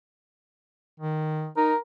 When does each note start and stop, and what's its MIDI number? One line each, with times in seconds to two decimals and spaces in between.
1.00 1.48 51
1.57 1.73 63
1.57 1.77 70